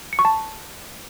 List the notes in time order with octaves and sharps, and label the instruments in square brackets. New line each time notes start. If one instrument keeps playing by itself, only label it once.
[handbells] C#7
C#6
A5